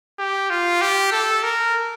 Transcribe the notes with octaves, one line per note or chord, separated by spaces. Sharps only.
G4
F4
G4
A4
A#4